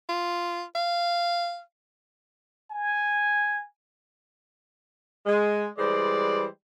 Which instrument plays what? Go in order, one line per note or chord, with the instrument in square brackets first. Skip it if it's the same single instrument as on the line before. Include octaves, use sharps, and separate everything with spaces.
[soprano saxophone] F4
F5
[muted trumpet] G#5
[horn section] G#3
E3 G3 G#3 C5 D5